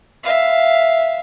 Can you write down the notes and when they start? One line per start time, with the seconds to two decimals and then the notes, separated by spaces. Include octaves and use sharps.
0.24 E5 F5